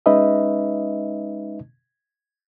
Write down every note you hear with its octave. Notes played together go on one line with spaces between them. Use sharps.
G#3 C#4 D#4 B4 D#5 E5